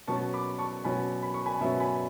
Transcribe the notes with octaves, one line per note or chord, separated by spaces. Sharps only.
B2 F#3 C#4 A5 C#6
B5 D6
A5 C#6
B2 F#3 C#4 G#5 B5
B5
C#6
G#5 B5
B2 F#3 C#4 E5 G#5
G#5 B5